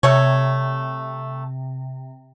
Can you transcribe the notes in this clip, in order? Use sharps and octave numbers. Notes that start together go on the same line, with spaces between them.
C3 G3 A3 C#5